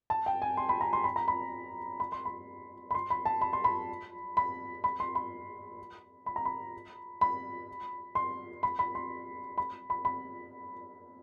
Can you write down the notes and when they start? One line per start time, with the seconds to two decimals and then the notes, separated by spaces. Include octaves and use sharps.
0.10 A5
0.26 G5
0.42 G#5
0.57 C6
0.69 B5
0.81 A#5
0.93 C6
1.04 B5
1.16 A#5
1.28 B5
2.00 B5
2.12 C6
2.25 B5
2.91 B5
2.95 C6
3.10 B5
3.25 A5
3.41 B5
3.53 C6
3.64 B5
4.37 B5
4.84 B5
5.00 C6
5.15 B5
6.26 B5
6.36 A#5
6.45 B5
7.21 B5
8.15 C6
8.63 B5
8.79 B5
8.95 C6
9.58 B5
9.90 B5
10.05 B5